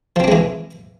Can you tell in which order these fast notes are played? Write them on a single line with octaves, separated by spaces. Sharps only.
F3 C4 D4 G#3 E3